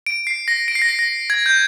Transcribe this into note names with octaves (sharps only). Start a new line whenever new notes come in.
D7
C7
A#6
D7
C7
A#6
C7
A#6
G#6
G6